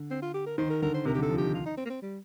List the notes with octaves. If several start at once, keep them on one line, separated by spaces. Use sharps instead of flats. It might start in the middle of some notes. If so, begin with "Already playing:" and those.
Already playing: D3
C4
F4
G4
A#4
D#3 C5
A#4
D3 A#4
C5
C3 A#4
G4
D3 A4
F3
D#3 G4
F4
D#4
C4
A#3
C4
G3